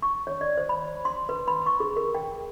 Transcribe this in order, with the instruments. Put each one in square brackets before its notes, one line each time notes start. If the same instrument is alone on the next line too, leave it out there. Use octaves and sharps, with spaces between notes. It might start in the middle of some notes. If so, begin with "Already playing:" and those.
[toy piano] C#6
C#5
D5
C5
B5
C6
B4
B5
C#6
G#4
A#4
G5